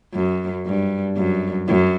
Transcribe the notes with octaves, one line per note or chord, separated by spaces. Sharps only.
F#2
G2
F#2
F#2